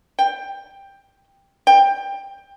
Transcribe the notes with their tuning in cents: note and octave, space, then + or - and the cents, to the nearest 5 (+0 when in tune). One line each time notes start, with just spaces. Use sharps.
G5 +10
G5 +15